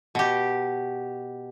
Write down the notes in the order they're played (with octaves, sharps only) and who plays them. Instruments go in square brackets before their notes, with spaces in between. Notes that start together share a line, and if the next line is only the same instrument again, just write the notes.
[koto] B2 G4